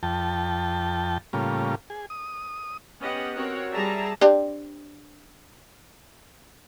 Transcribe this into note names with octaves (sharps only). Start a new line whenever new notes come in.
F2 G5 A5
A2 C#3 G3 A#3 F4
G#4
D#6
B3 C#4 G4 D#5 F#5
C4 F#4 A#4 C#5 F#5
G3 G#4 D5 E5 A5 A#5
C4 D4 G4